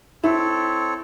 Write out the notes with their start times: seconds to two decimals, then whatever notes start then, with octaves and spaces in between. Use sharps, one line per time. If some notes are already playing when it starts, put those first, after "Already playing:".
0.24 C4 E4 A4 C#5